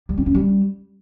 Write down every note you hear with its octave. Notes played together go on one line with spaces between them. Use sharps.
G3
C4
C#4
G3